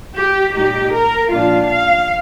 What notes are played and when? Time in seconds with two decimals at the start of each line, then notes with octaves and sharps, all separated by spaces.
0.16 G4
0.54 A#2 G#3 D#4 G4
0.92 A#4
1.30 A#2 F3 G#3 D4 F4 F5
1.68 F5